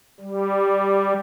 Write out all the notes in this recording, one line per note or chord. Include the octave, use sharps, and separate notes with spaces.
G3